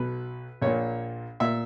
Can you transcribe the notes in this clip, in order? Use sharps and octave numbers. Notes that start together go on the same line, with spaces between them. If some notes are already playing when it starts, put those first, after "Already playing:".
Already playing: B1 B2 B4
A#1 A#2 C#5
A#2 E5